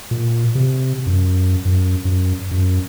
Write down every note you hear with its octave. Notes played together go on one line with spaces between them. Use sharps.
A#2
C3
F#2
F#2
F#2
F#2